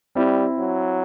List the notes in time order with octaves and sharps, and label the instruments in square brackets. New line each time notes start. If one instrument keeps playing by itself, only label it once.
[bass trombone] G3 [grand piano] C4 E4
[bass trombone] F#3